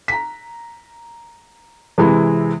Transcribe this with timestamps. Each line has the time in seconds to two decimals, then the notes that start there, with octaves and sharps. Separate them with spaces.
0.08 A#5 B6
1.98 C3 E3 G#3 E4